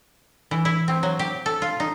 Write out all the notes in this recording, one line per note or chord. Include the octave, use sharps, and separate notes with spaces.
E3
E4
C4
F#3
G4
A4
F4
D#4